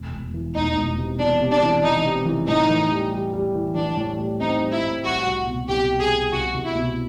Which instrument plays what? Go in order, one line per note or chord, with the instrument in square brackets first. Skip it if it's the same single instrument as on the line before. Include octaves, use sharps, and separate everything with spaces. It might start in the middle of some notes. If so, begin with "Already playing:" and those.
Already playing: [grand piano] E1
E1
E3
[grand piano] E1 [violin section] D#4
[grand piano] E1
C3
[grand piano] E2 [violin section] D4
[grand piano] C3
[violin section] D4
[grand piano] E3
[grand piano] E3 [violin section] D#4
[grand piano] C3
E3
[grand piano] A2 [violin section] D#4
[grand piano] E3
G3
G3
G3
E3
[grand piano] E3 [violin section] D4
[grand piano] A2
G3
[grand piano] C4 [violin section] D#4
[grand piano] G3
[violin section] E4
[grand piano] A2
[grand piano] G3 [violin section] F#4
[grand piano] C2
B2
[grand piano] C2 [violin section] G4
[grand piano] G3
[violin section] G#4
[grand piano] G3
[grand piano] C2 [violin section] F#4
[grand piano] C2
[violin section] E4
[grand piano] B2